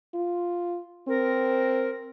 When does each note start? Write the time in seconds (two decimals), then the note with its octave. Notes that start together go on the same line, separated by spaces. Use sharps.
0.14 F4
1.08 C4 A#4